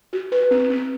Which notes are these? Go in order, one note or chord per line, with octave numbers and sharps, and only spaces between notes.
F#4
B4
C4
C4